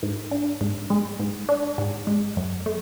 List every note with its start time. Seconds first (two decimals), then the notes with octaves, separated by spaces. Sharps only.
0.03 G#2
0.31 D4
0.61 G#2
0.90 G#3
1.20 G#2
1.49 D4
1.78 G#2
2.07 G#3
2.37 F#2
2.66 A3